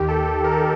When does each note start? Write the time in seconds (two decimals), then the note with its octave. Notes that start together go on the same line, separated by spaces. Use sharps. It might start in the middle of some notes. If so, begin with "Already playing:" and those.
Already playing: D#2 D#3 G4
0.08 A4
0.44 A#4
0.51 A4